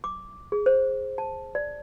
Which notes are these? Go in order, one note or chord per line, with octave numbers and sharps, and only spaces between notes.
D6
G#4
C5
A5
D5